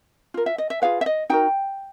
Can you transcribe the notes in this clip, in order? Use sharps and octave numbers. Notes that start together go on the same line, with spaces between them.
F4 A#4
E5
D#5
E5
F4 G#4 B4 F5
E5
D#5
D#4 F#4 A#4 G5